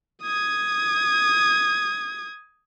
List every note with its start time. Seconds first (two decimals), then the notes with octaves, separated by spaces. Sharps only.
0.23 D#6 G#6